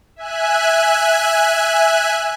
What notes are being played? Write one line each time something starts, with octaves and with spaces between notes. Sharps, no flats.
E5 G#5 F#6